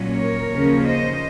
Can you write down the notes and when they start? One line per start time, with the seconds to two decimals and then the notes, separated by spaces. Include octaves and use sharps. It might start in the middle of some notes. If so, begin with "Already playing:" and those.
Already playing: A#2 F#3 C#4
0.13 A#4 C#5
0.50 D#2 C#3 F3 A#3 C#4
0.84 C5 D#5